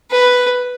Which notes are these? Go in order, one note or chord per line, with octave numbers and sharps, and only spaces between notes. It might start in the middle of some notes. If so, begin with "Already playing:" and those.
B4